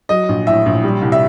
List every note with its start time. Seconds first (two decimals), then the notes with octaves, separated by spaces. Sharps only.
0.09 F#3 D#5
0.29 A#1
0.47 A2 E5
0.66 A#1
0.83 G3
1.02 C2
1.12 E5